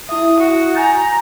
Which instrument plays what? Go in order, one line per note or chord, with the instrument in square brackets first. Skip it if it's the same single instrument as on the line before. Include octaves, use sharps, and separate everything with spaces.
[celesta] E4 E5 [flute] D#6
[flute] F#4
[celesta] G#5 G6 A6 [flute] A#5